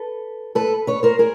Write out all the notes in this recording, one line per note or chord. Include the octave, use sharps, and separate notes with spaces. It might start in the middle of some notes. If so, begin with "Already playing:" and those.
Already playing: A4 B4
A4 B4
B4 C#5
A#4 C5
G#4 A#4